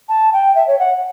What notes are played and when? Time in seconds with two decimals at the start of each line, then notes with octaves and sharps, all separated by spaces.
0.09 A5
0.33 G5
0.55 E5
0.67 C#5
0.79 F#5